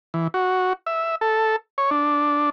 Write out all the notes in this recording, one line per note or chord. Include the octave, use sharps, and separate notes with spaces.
E3
F#4
E5
A4
C#5
D4